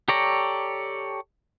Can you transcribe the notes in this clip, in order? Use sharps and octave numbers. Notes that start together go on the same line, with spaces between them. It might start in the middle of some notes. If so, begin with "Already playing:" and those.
G4 A4 C#5 D5 A#5